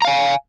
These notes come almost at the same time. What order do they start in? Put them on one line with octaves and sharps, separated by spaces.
A#5 F5 G#5